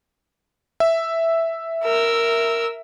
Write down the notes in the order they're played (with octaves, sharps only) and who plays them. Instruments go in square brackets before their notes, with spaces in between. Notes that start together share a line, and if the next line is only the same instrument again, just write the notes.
[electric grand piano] E5
[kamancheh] A#4 E6